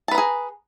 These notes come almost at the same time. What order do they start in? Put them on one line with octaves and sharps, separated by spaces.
A5 B4 A#5 G#4